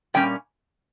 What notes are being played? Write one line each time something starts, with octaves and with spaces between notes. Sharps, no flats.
A#2 G3 C#4 G5